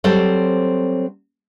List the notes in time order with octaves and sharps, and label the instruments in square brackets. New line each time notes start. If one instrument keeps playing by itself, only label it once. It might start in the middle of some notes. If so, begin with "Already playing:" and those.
[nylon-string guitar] F#3 G3 C4 A4 C5